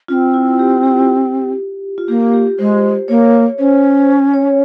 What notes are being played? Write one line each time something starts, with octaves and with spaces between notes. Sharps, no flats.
C#4 F4
C4
E4
G4
G4
F4
A#3 G4
G4
G#3 C5
A#3 C#5
C#4 C5
C5
C#5